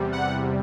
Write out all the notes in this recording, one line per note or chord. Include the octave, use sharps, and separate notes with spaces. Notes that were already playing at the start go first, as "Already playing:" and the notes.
Already playing: E2 C3 G3
F#5